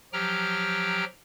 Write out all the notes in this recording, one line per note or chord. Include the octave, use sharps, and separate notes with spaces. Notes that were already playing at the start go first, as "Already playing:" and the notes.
F3 F#3 G4 G5 A#5 F6